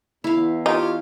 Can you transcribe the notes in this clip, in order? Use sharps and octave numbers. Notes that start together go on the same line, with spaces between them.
E2 E4 F5
D#4 F4 G4 C#5